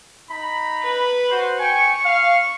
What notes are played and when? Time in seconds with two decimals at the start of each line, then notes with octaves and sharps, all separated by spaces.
0.31 D#4 A#5 B5
0.84 B4
1.30 F#4 C5
1.60 G5 G#5 C#6
2.05 F5